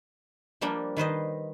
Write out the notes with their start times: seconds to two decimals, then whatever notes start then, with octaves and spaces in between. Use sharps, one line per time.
0.61 F3 G3 A#3 D4 G5
0.97 D#3 B4 C5 D#5